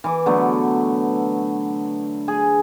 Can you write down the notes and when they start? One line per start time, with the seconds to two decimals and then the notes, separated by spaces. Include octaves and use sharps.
0.04 E3 D6
0.26 D3 F#3 A3 B3
2.28 G#4